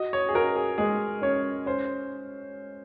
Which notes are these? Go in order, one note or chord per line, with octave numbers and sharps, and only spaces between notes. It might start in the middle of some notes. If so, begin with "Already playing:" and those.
Already playing: F#4 D#5
C#5
G#4
F#4 A#4
G#4
G#3 G#4
C#4 C#5
C#4 C5